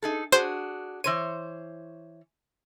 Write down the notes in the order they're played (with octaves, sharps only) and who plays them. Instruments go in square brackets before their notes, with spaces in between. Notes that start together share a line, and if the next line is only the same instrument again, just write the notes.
[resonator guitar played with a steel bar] D#4 G#4 A4
[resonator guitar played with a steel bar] D4 F#4 G#4 [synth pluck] C5
[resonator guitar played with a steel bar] E3 C5 C#5 [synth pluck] D#7